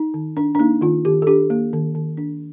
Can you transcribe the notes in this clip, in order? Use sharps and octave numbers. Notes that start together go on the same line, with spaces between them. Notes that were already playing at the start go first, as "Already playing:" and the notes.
Already playing: D#4
D#3
D4
D4
A#3 D#4
D#3 F4
D#3 G4
A4
D4 G4
A#3
D#3
D#3
D4